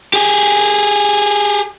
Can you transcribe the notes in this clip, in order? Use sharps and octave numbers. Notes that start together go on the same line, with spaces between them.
G4 G#4